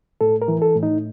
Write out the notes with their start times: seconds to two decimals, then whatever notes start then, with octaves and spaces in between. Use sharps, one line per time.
0.21 A2 A4
0.42 A#4
0.48 E3
0.62 A4
0.76 A2
0.83 D#4